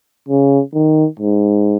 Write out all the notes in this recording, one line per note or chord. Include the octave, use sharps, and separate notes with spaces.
C#3
D#3
G#2